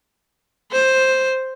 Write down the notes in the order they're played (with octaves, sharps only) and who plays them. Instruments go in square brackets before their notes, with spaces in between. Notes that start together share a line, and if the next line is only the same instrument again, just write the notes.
[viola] C5